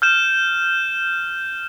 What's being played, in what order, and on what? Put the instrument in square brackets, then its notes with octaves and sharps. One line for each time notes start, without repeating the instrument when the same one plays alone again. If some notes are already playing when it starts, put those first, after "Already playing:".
[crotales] F6 G6 E7